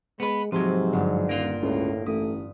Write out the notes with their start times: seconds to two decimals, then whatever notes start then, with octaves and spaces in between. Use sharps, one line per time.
0.20 G#3 B3 B4
0.52 G#2 C3 F3 F#3 B4
0.93 G1 D4
1.29 D#1 A#3 F4
1.62 C#2 A2
2.06 A1 A3 D#6 B6